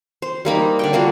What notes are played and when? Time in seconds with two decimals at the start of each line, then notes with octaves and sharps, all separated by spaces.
0.22 C5
0.45 G3 A#3 D#4 B5
0.79 D3 G4 G5
0.93 G3 A#3 F4 F#4